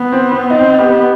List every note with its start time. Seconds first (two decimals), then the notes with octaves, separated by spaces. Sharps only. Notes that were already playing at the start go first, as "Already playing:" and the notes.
Already playing: B3
0.12 C4
0.32 C4
0.50 C4 D#4
0.79 B3 G4